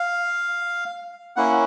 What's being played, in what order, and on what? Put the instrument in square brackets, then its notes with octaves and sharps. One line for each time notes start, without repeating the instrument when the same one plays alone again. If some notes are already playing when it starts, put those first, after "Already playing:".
Already playing: [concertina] F5
A#3 C#4 E4 F#5